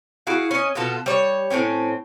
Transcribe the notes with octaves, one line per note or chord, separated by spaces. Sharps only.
E4 F#4 G#4 F5
C#4 D#5
B2 B3 F4 A4
G3 C#5
A2 C3 C4 C#4